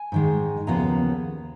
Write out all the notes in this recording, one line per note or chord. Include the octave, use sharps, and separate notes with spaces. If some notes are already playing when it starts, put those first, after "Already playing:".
Already playing: G#5
G#2 D#3 G#3
D#2 C#3 F3 B3 A#5